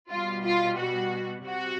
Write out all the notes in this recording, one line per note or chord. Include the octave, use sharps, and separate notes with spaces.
B2 G3 F4
F4
F#4
C3 F#4